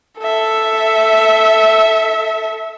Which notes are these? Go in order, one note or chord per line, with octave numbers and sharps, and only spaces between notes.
A4 E5